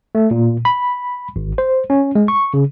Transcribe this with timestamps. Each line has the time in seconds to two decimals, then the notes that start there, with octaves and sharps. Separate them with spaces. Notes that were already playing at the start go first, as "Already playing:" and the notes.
0.15 A3
0.31 A#2
0.65 B5
1.36 G#1
1.58 C5
1.90 C#4
2.15 G#3
2.28 C#6
2.54 C#3